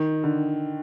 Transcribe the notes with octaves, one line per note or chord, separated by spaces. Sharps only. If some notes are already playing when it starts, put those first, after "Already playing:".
Already playing: D#3
D3